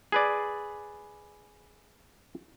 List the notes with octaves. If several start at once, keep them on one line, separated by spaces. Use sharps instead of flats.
G#4 B4 D5